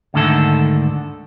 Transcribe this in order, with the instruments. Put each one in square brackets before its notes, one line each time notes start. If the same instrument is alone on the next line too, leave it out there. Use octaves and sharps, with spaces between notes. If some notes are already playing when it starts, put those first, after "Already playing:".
[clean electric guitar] D2 G#2 D3 D#3 A4